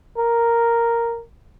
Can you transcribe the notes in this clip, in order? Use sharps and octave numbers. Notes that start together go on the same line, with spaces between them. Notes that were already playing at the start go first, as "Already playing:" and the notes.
A#4